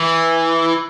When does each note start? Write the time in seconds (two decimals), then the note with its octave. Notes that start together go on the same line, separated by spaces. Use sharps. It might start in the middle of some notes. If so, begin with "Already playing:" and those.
Already playing: E3